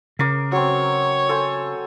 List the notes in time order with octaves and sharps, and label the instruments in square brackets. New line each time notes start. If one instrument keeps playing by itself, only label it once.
[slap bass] C#3 [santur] A#4 D6
[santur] F#3 C4 [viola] C#5
[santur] A4 C5 G#5